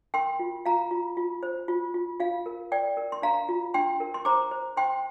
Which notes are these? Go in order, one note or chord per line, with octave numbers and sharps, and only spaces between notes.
A#4 G5 C6
F4
F4 F5 A#5
F4
F4
C5
F4
F4
F4 F5
A#4
A#4 D5 G5
A#4
C6
D4 F5 A#5
F4
D4 G5 C6
A#4
C6
C5 A#5 D6
C5
C5 G5 C6